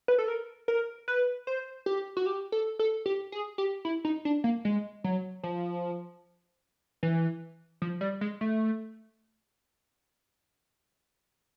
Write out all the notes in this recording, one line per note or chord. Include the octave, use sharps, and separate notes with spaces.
B4
A4
A#4
A#4
B4
C5
G4
F#4
G4
A4
A4
G4
G#4
G4
E4
D#4
D4
A#3
G#3
F#3
F3
E3
F3
G3
G#3
A3